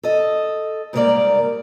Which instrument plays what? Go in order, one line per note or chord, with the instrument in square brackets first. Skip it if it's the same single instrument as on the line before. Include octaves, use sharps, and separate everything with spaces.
[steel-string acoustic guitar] A4 D#5
G#2 C#3 G3 A#3 A#4 D5